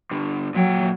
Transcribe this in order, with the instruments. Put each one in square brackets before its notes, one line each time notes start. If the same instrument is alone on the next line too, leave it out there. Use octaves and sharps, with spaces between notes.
[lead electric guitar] G2 D3
[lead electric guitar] A#2 G5 [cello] F#3